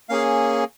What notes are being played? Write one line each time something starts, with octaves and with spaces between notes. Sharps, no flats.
A#3 C#4 G#4 F5